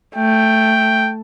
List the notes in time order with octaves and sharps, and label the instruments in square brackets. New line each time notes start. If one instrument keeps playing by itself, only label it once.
[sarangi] A3 [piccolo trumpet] G5